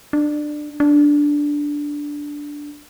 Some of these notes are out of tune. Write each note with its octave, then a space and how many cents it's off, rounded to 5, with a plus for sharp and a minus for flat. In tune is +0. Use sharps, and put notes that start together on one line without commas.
D4 +20
D4 -5